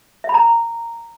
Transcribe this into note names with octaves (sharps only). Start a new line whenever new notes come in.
E5
B5
A#5